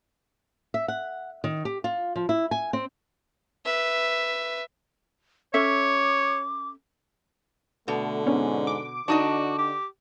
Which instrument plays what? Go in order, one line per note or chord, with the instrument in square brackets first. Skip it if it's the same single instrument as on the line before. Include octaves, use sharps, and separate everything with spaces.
[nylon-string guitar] E5
F#5
D#3
G4
F4
F3
E4
G#5
C4
[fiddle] B4 E5
[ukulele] C#4 A4 E5 [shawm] C#5 [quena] D6
[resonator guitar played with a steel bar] B2 [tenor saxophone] D3 [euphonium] A3
[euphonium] G#2 [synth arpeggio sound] B3 C#4 D4
[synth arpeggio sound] D6
[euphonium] D3 [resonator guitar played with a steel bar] D4 D#4 D#5 [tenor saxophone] F#4
[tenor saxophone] G4